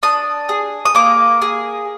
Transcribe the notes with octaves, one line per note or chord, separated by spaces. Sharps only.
D4 D#6
G#4
D#6
A#3 D6
G#4